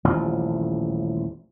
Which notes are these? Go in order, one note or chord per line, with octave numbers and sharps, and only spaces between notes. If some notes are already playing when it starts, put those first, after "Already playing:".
D#1 A1 F3